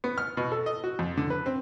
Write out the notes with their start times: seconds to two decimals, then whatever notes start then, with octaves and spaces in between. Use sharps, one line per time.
0.04 B3
0.18 F6
0.37 B2
0.52 A4
0.66 D#5
0.84 F#4
0.99 F2
1.17 D3
1.30 B4
1.46 C4